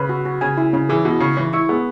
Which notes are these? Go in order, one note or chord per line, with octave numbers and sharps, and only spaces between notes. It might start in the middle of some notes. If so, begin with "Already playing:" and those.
Already playing: C#3 B4
F#4
F#4
C#3 G#5
E4
C#3 C#4
E3 G#4
B2 E4
C#3 C#6
E3 C#5
E4 C#6
B3 G#4